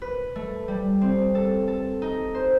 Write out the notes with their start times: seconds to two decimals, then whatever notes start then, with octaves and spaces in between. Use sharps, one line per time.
0.02 B4
0.36 A3
0.68 G3
1.01 C4
1.35 A4
1.68 A4
2.02 D#4
2.35 C5